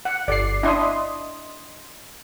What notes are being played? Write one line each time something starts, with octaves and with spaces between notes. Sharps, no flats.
F#5
G1 D5 C7
D4 E4 D#5 C6 D#6